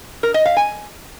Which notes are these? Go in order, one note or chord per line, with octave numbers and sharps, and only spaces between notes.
A#4
D#5
F5
G#5